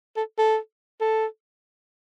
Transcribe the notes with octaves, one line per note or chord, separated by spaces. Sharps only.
A4
A4
A4